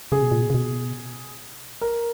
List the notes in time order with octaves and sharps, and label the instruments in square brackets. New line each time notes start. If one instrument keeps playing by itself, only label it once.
[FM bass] C#3 [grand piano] G#4
[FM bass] B2
A#2
B2
C#3
B2
[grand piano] A#4